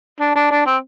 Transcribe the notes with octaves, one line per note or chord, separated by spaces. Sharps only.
D4
D4
D4
C4